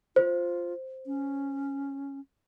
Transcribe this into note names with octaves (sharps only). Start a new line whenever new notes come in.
F4 C5
C#4